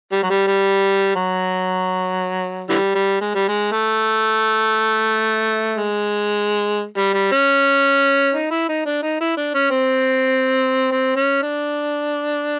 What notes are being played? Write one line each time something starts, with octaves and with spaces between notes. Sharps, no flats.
G3
F#3
G3
G3
F#3
D3 E3 G3
G3
G#3
G3
G#3
A3
G#3
G3
G3
C#4
D#4
E4
D#4
D4
D#4
E4
D4
C#4
C4
C4
C#4
D4